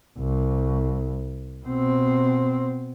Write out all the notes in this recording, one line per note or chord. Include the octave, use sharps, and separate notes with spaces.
C2
B2 C4